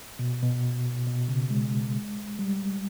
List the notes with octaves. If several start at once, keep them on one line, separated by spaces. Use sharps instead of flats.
B2
B2
B2
C#3
G#3
G3